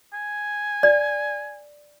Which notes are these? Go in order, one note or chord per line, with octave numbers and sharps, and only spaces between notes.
G#5
D5